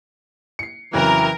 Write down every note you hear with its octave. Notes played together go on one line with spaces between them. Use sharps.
C7 C#7
F2 C#3 E3 F#3 A#4